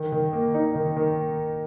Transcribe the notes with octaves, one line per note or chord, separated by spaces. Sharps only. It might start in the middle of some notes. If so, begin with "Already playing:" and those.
Already playing: D#3
D#3
A#3
D#4
D#3
D#3